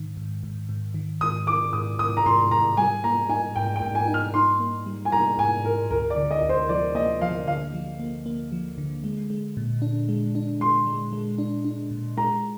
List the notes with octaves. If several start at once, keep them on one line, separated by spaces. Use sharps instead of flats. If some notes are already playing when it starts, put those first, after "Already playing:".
Already playing: G#2 D#3
G#2
G#2
G#2
D#3
G#2 D#6
D#3 D6
G#2 D#6
G#2 D#6
A#5
G#2 C6
G#2 A#5
G3 G#5
A#3 A#5
D#4 G#5
G#2 G5
G5
G#2
G#5
D#4
F6
D#4 C6
A#3
G3
G#5
G3 A#5
G#2 G#5
G#2 A#4
D2 A#4
D5
D3
D#5
D2
C5
F3 D5
A#3 D#5
F3 F5
D3 F5
F3
A#3
A#3
F3
D3
G#3
G#3
A#2
D4
G#3
D4
G#3 C6
G#3
G#3
D4
D4
A#2
G#3 A#5